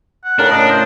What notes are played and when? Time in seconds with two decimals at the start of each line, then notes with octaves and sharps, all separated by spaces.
0.24 F#5
0.39 A2 C#3 D4 A#4
0.51 D#5
0.70 C5